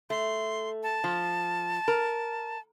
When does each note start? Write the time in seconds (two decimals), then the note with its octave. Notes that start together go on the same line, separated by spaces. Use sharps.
0.10 A3 C6
0.83 A5
1.04 F3
1.88 A#4